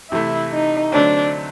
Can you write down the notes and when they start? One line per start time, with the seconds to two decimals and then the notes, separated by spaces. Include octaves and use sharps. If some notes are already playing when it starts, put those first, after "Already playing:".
0.11 C3 E3 A3 E4
0.52 D#4
0.93 D3 F#3 A3 C4 D4